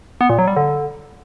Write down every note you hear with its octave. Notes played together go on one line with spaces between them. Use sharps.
B3
A#2
F#3
G3
D3